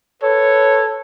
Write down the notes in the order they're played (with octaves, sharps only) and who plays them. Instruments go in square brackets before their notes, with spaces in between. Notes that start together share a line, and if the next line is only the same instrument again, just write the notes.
[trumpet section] A4 B4 C#5